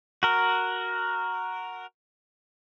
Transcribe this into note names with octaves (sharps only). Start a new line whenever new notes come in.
F#4 A#4